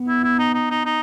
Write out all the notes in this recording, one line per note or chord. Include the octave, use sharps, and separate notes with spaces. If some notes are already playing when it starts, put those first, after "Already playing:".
Already playing: B3
E4
E4
D#4
D#4
D#4
D#4